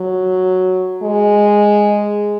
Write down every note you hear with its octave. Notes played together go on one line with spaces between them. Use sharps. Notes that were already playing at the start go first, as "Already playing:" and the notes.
Already playing: F#3
G#3